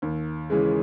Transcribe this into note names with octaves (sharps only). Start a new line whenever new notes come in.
D#2
C#3 E3 G#3